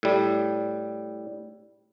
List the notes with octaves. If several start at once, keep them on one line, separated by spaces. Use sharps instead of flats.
A2 G3